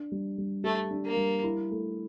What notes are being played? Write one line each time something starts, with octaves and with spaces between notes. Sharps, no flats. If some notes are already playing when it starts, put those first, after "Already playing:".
Already playing: D4
G3
G3
A3 G4
D4
A#3
G3
E4
A3